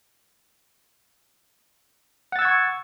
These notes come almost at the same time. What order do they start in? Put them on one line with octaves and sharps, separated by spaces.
F#5 A6 E6 G#6 C#6